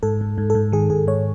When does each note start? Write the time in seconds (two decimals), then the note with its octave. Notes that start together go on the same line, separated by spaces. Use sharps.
0.03 G#2 A4
0.21 G#2
0.38 G#2
0.50 A4
0.55 G#2
0.72 D#3 G#4
0.90 G#2 G#4
1.07 G#2 C#5